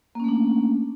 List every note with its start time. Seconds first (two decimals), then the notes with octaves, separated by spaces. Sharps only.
0.15 A#3
0.20 C#4
0.24 A3
0.28 D4